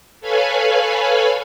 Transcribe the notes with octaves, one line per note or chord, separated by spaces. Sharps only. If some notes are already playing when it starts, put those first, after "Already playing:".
A4 B4 C#5 F5 G#5 B5